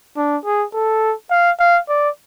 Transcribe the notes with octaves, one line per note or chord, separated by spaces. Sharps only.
D4
G#4
A4
F5
F5
D5